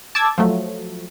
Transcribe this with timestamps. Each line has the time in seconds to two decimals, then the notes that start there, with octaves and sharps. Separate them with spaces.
0.15 A5 D6 E6 G#6
0.38 F3 F#3 A3